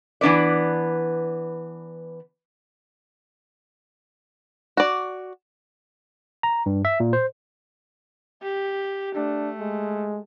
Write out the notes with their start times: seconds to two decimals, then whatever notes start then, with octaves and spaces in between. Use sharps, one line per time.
0.21 E3 B3 D4 B4 D5
4.77 F#4 D5
6.43 A#5
6.66 G2
6.85 E5
7.00 A#2
7.13 C5
8.42 G4
9.15 A3 D4
9.59 G#3